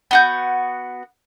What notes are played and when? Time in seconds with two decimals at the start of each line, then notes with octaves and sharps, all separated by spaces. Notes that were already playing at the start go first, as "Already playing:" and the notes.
0.11 B3 F#4 G6